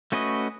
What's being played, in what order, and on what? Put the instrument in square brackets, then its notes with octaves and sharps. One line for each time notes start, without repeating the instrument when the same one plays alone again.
[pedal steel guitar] A3 C#4 F#4 B4 D#5